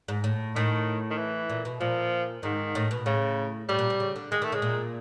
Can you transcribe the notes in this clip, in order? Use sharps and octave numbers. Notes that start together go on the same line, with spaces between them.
G#2
A2
A2 D#3
D#3
E3
A#2
B2
A#2 F3
G#2 D#3
A2
B2
A2 C#3
A2 G3
A#2
C3
C#3
D3
D#3 G#3
D#3 A3
C#3 G#3
A#2